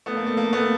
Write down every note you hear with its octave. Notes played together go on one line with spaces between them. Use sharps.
A3 B3
A#3
A3
A#3
A3 B3